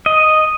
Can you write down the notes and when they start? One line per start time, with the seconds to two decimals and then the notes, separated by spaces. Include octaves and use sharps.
0.06 D#5